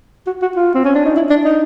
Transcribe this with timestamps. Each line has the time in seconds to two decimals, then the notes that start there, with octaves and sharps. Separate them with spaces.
0.27 F#4
0.42 F#4
0.56 F4
0.74 C4
0.85 C#4
0.95 D4
1.05 D#4
1.16 E4
1.30 D4
1.45 D#4